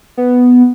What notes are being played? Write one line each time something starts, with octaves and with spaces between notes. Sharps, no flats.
B3